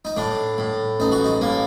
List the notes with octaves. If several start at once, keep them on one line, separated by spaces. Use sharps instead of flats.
D#4
A2 D4
A2
A1 D#4
F#4
D#4
A2 A#3